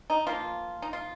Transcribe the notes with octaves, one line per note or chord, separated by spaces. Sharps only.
D#4
F3 A#3 F4
D#4
F4